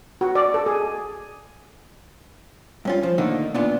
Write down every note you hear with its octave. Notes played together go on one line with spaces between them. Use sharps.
F#4
D5
A4
G#4
G2 C#4 F4
F3
D3 D#3 A3 A#3 D#4
A#2 B3 D4 F4